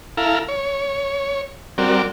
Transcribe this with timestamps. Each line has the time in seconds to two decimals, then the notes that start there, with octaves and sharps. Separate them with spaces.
0.17 E4 A4 F5 A#5
0.49 C#5
1.78 G3 C4 F#4 A#4 D5